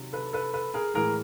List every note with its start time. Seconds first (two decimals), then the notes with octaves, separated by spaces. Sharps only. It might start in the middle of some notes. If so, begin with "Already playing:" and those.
Already playing: C3 D#3 F#3
0.13 A4 B4
0.33 A4 B4
0.54 A4 B4
0.74 G#4 A#4
0.94 A2 E3 G#3 G#4 A#4